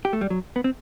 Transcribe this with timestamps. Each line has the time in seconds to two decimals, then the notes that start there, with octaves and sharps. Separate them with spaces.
0.05 G4
0.13 A3
0.21 G3
0.30 F#3
0.56 B3
0.64 C4